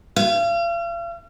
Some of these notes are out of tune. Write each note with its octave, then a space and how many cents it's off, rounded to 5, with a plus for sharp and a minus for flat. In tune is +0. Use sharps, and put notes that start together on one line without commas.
F5 -40